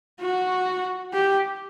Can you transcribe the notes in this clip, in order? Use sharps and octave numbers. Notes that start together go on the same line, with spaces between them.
F#4
G4